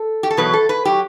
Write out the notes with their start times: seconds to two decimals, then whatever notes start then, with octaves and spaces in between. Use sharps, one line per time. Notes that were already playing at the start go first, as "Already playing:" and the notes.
Already playing: A4
0.23 G4
0.30 A4
0.37 E2 B2 F#3 B4
0.53 A4
0.69 B4
0.85 F#3 G4